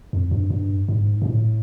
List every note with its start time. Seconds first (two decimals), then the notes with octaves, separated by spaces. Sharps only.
0.13 F2
0.31 G2
0.50 G2
0.89 G#2
1.22 A#2
1.26 A2